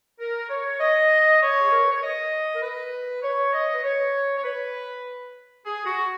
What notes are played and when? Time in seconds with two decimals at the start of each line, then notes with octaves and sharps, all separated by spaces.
0.20 A#4
0.50 C#5
0.80 D#5
1.41 C#5
1.61 G#4
1.71 A#4
1.82 B4
1.92 C#5
2.02 D#5
2.55 A#4
2.62 B4
3.23 C#5
3.53 D#5
3.73 B4
3.84 C#5
4.37 C#5
4.44 B4
5.65 G#4
5.85 F#4